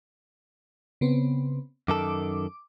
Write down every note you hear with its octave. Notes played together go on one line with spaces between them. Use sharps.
C#3 B3 C4
F#2 D#3 A4 D6